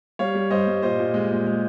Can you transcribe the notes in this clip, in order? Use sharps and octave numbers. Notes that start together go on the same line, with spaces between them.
G3 C#5 F5
G3
G2 C5 D#5
G3
A#2 C5 D#5
A#2
G#3
A#2
G#3